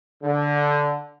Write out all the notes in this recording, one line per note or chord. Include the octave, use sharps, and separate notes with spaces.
D3